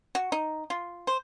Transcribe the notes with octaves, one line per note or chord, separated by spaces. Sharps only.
F#4
D#4
F4
C5